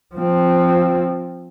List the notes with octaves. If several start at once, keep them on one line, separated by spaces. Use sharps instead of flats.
F3 C4